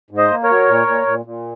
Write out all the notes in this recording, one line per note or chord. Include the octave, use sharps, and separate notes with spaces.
G#2
C5 D#5
A#3
A#4 C#5
F#3
A#2
A#2
A#2
A#2